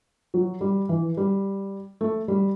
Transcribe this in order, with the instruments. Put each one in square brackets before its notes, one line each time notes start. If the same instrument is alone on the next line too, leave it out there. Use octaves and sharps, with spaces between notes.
[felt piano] F#3
G3
E3
G3
A3
G3